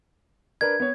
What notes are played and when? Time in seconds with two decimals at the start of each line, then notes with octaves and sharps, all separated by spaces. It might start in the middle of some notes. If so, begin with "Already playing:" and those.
0.61 D4 A#4 B4 G#6
0.80 B3 C#5